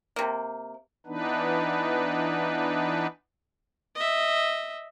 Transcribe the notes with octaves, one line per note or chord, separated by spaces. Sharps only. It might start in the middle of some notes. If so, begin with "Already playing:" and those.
C3 A#3
E3 B3 D4 D#4 B4
D#5 E5